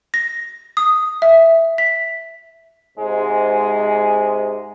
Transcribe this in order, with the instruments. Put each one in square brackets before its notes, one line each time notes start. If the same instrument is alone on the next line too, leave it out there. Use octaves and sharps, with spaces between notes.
[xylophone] A#6
D#6
E5
B6
[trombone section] G#2 C3 G#3